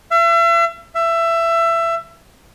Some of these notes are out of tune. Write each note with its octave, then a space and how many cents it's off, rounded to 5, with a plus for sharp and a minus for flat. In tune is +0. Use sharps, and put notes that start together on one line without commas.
E5 +40
E5 +20